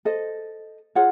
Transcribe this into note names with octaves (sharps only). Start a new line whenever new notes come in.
A4 C5 D#5
F4 G#4 C#5 F#5